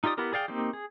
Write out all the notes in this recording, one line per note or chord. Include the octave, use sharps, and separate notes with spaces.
D#4 F4 G4 D5 D#6
B3 E4 G4 A#4
G#4 D5 F5 G5
A#3 C4 D#4 G4
G#4